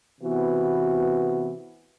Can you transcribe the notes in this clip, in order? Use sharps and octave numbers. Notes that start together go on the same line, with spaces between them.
C3 E3 B3 F#4